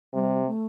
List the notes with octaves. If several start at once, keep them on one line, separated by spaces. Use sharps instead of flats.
C3 G3
A3